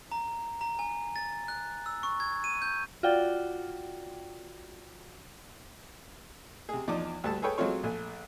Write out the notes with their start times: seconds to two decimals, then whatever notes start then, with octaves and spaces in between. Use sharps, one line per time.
0.12 A#5
0.61 A#5
0.79 G#5
1.16 A6
1.48 F#6
1.86 E6
2.03 C#6
2.20 G#6
2.44 D#7
2.62 G6
3.03 F4 F#4 D5 G5
6.69 C3 G#4
6.88 E2 F3 D#4 D5 D6
7.24 D2 G2 A4 A5
7.42 G#4 A4 B4 C#5 G5
7.58 F#3 G#3 A3 C4 F4 C#5
7.83 A#1 A3 G#5